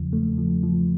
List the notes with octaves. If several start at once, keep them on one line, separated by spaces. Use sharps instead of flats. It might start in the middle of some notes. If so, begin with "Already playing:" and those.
Already playing: E2 C#3 F3
A3
F3
F3